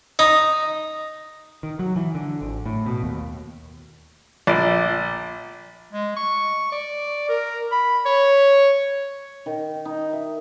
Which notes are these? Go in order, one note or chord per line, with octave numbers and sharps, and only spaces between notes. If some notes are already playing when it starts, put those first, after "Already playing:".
D#4
D#3
F#3
E3
D3
G#1
A2
B2
D#2
A#1 D5
G#3
C#6
D5
A#4
B5
C#5
D#3
D#4
E5